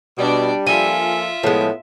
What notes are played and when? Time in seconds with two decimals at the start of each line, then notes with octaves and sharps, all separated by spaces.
0.18 B2 G3 D4 D5
0.66 F3 A#3 F4 A4 E5 G#5
1.43 A2 F3 G#3 B3